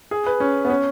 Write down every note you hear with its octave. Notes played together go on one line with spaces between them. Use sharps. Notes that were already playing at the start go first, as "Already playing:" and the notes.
G#4
B4
C#4
B3
C#4